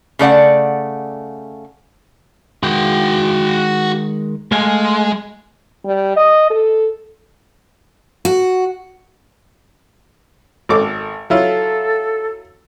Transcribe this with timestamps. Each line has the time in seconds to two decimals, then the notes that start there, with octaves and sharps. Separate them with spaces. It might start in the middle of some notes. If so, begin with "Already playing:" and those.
0.19 C#3 A3 D5 F#5
2.63 D#3 G#3 F#4 G5
4.52 G#3 A3 F5 G#5
5.85 G3
6.16 D#5
6.50 A4
8.25 F#4
10.69 G#1 A4 D6
11.30 F#3 E4 F4 A4